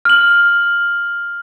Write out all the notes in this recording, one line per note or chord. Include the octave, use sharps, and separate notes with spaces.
F6 F#7